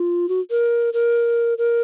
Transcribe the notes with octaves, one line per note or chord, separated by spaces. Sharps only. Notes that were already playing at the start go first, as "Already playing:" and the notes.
Already playing: F4
F#4
A#4
A#4
A#4